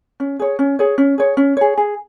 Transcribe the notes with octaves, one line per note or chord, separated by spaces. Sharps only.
C#4
G#4 C#5
C#4
G#4 C#5
C#4
G#4 C#5
C#4
G#4 C#5
G#4